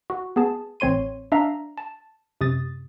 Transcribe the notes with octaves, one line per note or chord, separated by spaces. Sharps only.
F#4
B3 G#4 A5
A1 C4 C#5 C6 D#7
D4 E5 F5 A#5
A5
F#2 C3 D#6 A6